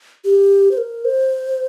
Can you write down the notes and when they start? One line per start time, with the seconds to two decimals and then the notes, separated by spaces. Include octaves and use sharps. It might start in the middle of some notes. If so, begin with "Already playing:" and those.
0.25 G4
0.71 C5
0.78 A#4
1.05 C5